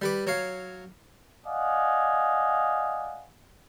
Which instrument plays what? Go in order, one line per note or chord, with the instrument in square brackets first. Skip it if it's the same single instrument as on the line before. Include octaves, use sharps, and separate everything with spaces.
[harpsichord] G3 B4 D6
F#3 C#5 F5
[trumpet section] D5 D#5 F5 F#5 G#5